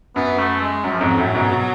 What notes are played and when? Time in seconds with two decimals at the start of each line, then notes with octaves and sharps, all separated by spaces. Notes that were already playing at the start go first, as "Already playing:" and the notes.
0.16 F#2 B3
0.39 A3
0.61 G#3
0.84 F#2 F#3
0.92 F3
1.01 F2 G#2 F#3
1.17 F#2 A2
1.35 G#2 B2
1.52 B2